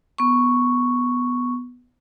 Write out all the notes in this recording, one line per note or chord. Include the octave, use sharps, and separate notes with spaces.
B3 C#6